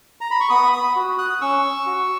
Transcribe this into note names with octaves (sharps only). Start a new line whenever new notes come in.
A#5
B5
C#6
B3 B5 D#6
B5 D#6
F#4
D#6 F#6
D#6
C#4 C#6 E6
F#4